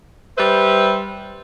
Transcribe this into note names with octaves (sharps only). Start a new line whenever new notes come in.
G3 B4 C5 E5